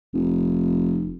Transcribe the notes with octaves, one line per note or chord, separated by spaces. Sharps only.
F1